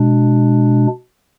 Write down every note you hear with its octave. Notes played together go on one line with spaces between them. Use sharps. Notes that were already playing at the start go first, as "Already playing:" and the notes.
Already playing: B2 G#3 D4